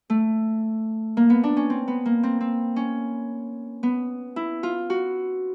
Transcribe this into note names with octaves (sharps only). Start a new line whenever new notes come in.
A3
A#3
B3
D4
C#4
C4
B3
A#3
C4
C4
C#4
B3
E4
F4
F#4